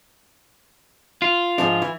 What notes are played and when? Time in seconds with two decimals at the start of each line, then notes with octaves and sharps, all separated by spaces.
1.22 F4
1.58 G#2 F3 D4
1.82 E3